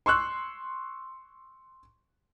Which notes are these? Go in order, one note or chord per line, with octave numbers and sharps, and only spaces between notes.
C6 C#6 E6 F#6